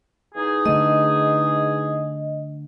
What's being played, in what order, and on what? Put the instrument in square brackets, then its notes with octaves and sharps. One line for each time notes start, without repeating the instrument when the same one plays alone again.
[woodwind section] E2 D#4 G#4
[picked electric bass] D3 A3 [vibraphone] D#5